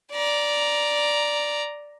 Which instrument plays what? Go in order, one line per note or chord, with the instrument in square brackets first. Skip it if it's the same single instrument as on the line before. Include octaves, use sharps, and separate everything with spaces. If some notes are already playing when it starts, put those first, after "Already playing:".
[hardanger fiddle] D5 A#5